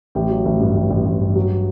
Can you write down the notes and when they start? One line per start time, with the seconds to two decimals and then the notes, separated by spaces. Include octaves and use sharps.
0.15 A1 G4
0.30 F#3
0.45 A1
0.60 G2
0.75 A1
0.90 A1
1.05 A1
1.21 G2
1.36 F#3